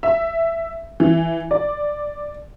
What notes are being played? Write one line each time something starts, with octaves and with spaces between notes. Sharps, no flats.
E5
E3
D5